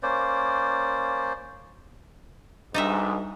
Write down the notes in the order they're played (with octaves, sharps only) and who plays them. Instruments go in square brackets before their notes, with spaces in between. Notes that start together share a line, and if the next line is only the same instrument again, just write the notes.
[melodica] A#3 C#4 C5 D5
[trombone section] B1 G#2 [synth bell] G3 D4 [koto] D#4 D#5 E5